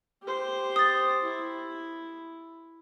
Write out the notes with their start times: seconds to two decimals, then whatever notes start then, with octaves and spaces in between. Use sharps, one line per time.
0.23 G4 C5
0.76 D#6 A6
1.24 E4